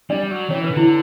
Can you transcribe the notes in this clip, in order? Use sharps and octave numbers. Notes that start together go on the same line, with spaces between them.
G3 D4 D5
F#3
E3 C#4 C#5
B4
D3
E4